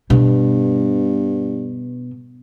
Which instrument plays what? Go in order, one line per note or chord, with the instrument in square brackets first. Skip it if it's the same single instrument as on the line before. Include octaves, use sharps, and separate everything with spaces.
[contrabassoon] G2 [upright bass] B2